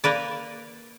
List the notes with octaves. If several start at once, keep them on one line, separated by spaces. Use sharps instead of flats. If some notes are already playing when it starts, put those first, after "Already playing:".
A#3 A#4 B4 D5